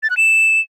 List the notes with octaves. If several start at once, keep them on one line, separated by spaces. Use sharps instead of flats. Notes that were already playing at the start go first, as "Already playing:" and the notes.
A6
F#6
E7